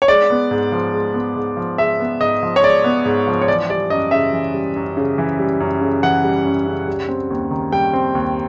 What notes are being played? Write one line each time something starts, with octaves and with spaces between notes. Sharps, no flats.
C#5
G#3 D5
B3
G#2
F3
G#3
B3
G#2
F3
G#3 E5
B3
G#2 D#5
F3
C#5
G#3 D5
B3
G#2
F3
C#5
E3 D5
G3 D5
F#2 D#5
C#3 E5
E3
G3
F#2
C#3
E3
G3
F#2
C#3
E3 F#5
G3
F#2
C#3
G3
C4
D#2
D#3
G3 G5
C4
D#2